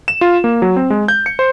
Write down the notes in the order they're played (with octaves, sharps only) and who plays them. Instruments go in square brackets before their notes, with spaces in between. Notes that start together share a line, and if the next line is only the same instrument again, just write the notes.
[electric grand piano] E7
F4
A#3
F#3
C4
G#3
G6
C#7
C5